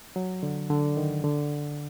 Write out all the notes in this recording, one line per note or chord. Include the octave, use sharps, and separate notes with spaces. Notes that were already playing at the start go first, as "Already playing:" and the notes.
F#3
D3
D3
D#3
D3